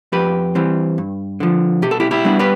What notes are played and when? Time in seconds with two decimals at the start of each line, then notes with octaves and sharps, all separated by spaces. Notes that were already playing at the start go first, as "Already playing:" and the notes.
0.12 F2 G4 B4
0.55 E3 G3 C4
0.98 G2
1.40 D3 F3
1.82 B2 G4
1.91 A4
2.00 E4 G4
2.11 E4 G4
2.25 G3 B3 D4
2.39 G4 B4